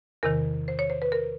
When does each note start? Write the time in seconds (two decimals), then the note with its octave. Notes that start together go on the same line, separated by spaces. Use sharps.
0.23 E2 C3 D#3 A#4
0.68 C5
0.79 C#5
0.90 C5
1.02 B4
1.12 A#4